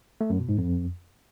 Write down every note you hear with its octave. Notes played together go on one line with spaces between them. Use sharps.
A3
F#2
B2
G#2
F2